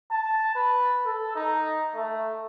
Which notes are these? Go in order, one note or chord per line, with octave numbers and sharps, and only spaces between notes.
A5
B4
A4
D#4
A3